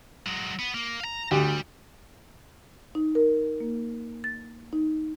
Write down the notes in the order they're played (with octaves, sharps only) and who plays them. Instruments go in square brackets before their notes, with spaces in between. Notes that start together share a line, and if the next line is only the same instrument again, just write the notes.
[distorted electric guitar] F#3 G#3
B3
A#3
F5 A#5
[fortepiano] D2 G4 [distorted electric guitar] G3
[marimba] D#4
A#4
A#3
A6
D#4